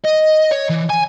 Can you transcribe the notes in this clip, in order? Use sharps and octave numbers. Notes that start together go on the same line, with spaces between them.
D#5
C#5
E3
G#5